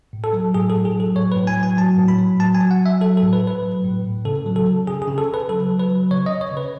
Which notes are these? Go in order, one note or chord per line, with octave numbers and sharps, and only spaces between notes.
A2
A4
F#3
A2 G#4
A4
A2
G#4
F#3 A4
A2 C#5
B4
A2
G#5
F#3
G#5
F#3 A5
A2
B5
F#3
F#3 A5
G#5
F#3
F#5
F#3 E5
F#3 A4
A4
A2
B4
A2
B4
F#3
A2
A2
C#3 A4
F#3
A4
C#3
C#3 G#4
G#4
C#3
A4
C#3
B4
F#3 A4
F#3
B4
F#3
C#3 C#5
D#5
C#3
C#5
C#3
B4